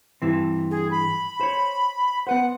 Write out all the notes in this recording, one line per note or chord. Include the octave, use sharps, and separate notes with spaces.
G2 E3 C4
G#4
B5
C5 C#5
B3 B4 C5 F#5